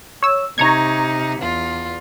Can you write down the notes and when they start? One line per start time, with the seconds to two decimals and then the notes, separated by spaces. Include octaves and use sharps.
0.23 C#5 E6
0.58 C3 D#4 A#5 C#6 G#6
1.40 E2 F4